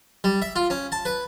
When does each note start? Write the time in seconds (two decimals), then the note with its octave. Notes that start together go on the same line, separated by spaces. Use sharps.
0.24 G3
0.42 E5
0.56 F4
0.70 C#4
0.92 A5
1.05 B4